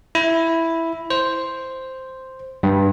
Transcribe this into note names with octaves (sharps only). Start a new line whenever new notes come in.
E4
C5
G2